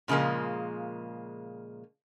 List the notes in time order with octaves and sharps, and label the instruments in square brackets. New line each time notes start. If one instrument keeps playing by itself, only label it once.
[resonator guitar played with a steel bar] A#2 C#3 F3 G#3 A#3